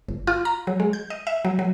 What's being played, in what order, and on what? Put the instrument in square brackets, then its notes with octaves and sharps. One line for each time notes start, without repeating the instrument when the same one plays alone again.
[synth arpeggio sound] G1
F4
A#5
F#3
G#3
G6
D#5
E5
F#3
F#3